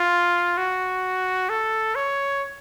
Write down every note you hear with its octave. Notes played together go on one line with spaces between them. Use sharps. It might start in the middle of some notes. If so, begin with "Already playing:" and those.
Already playing: F4
F#4
A4
C#5